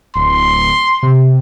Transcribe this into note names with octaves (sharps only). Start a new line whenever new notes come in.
D1 C6
C3